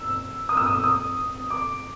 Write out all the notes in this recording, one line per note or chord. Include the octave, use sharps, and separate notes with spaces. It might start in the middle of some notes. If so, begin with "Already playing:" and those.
Already playing: E6
D#6
E6
D#6
D#6
D6